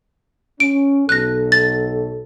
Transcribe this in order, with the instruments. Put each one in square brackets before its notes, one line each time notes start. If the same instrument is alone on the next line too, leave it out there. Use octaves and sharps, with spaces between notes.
[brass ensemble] C#4 [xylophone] D7
[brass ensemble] B1 A4 [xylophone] F#6 A#6
[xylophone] A6